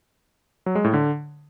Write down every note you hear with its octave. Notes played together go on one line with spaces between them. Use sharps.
F#3
G#3
A2
D3